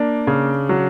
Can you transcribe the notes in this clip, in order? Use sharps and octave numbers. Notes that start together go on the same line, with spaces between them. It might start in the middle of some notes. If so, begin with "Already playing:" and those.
Already playing: A#3 D4
C#3
F#3